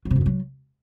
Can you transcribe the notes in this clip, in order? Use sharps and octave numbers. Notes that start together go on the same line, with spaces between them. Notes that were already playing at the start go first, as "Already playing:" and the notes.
F#3
C3
F#2
C3
F#3